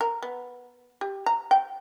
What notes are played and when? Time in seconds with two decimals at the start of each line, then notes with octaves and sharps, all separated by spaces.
0.01 A#4
0.23 B3
1.01 G4
1.26 A#5
1.51 G5